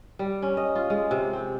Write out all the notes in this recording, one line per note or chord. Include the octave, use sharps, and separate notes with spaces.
G3
C#4
D#5
F4
G#3
C3
C4